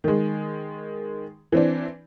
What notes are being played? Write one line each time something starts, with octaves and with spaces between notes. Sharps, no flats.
D#3 G#3
E3 C4 D4